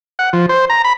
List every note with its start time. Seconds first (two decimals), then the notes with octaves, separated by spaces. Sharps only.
0.19 F#5
0.33 F3
0.49 C5
0.70 A#5
0.84 B5